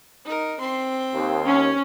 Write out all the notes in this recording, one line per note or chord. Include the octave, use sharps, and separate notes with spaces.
D#4 A#4
C4 C6
D#2
C#4